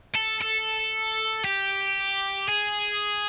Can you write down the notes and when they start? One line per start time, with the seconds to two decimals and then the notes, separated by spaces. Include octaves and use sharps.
0.15 A4
0.42 A4
1.44 G4
2.49 G#4